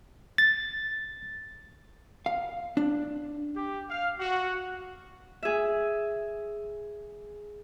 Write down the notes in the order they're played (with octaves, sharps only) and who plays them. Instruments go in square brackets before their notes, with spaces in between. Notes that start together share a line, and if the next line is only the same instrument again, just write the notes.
[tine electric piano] A6
[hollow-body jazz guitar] F5
D4
[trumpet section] G4
F5
F#4
[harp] G#4 E5